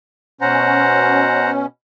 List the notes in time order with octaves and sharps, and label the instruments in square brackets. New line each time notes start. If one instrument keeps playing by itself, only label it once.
[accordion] B2 C#4 [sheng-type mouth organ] C5 F#5 A#5